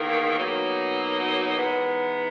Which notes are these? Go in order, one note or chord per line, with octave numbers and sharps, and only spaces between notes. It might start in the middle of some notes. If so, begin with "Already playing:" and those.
Already playing: E2 D#3 A#3
B2 F#3 A#3 D#4
G#2 E3 B3